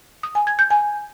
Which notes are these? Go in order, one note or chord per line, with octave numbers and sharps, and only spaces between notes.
D#6
G#5
G#6
G6
G#5